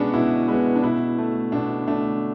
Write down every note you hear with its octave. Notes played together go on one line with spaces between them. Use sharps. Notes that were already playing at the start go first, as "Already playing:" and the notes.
Already playing: B2 G#3 B3 C#4 D4
B2 E4
G#3 B3 E4
D4
B2 E4
A3
B2 D4
A3 D4